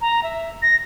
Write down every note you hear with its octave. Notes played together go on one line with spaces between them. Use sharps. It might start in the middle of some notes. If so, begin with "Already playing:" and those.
A#5
E5
A#6